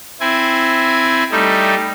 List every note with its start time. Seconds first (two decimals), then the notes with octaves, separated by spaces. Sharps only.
0.20 C4 E4 G#5
1.32 G3 A3 D#4